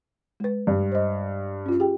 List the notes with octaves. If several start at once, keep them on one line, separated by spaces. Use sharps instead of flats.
G#3 B4
G2
C5 D#5
C#4 F4
G4 G#4 G5